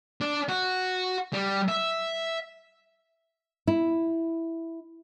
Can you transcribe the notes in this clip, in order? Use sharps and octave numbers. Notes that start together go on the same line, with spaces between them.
D4
F#4
G3
E5
E4